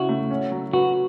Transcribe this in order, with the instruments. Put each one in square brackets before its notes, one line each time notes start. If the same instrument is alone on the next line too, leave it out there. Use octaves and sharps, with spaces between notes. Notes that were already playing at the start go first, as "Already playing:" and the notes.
Already playing: [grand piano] C#3 E4 [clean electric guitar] F#4
[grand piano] A3
C#4
F#3
[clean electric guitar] F#4 [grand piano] B4